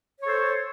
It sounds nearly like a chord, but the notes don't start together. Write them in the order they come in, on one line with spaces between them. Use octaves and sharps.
C#5 A4 C5